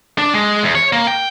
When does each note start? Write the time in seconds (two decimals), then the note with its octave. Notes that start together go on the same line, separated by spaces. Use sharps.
0.18 D4
0.34 G#3
0.63 E2
0.75 C#5
0.93 A#3
1.07 G5